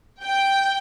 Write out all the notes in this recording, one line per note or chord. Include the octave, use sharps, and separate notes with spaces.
G5